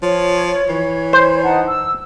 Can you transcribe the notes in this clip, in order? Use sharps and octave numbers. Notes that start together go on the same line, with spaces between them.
F3 C#5
E3
C5
D#4 F#5 A5
E6